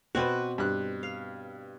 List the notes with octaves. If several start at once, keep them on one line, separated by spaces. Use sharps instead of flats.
B2 C4 F#4 B4 D5
G2 F#6
F5